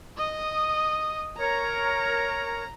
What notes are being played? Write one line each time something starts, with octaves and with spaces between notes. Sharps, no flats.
D#5 D#6
A#4 C#5 A#5